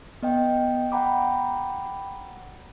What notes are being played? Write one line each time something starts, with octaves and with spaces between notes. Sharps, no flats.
B3 D#5 G5
F#5 G5 A#5 B5 D6